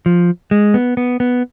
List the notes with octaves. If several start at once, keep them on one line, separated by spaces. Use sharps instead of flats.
F3
G#3
B3
B3
B3